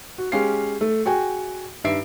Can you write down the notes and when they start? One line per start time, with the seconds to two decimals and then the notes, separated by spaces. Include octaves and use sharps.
0.18 F#4
0.32 G#3 C#4 G4 F5 C7
0.81 A3
1.06 F#4 G#4 G5 G#5
1.84 G2 D#3 E5 C7 D7